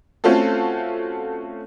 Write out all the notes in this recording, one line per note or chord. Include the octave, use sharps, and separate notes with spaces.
A3 C4 C#4 F4 F#4 A4